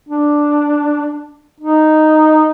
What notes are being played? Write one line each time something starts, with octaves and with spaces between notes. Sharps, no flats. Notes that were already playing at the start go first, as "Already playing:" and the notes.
D4
D#4